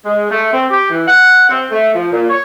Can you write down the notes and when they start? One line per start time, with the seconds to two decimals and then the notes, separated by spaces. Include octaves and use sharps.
0.05 G#3
0.31 A3
0.53 C4
0.70 G4
0.90 E3
1.07 F#5
1.48 C4
1.71 A3
1.95 F3
2.12 A#2
2.30 C#5